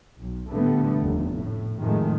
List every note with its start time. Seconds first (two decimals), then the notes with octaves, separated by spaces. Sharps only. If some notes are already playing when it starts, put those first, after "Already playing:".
0.20 B1
0.50 A2 D3 G3 A3 B3
0.98 F1 D#2
1.33 A2
1.80 F2 A2 D#3 G#3 A3